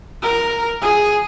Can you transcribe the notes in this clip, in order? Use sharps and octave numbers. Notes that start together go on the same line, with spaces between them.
A#4
G#4